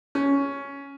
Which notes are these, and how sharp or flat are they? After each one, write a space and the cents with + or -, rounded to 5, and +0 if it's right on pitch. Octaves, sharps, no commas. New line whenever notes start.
C#4 +10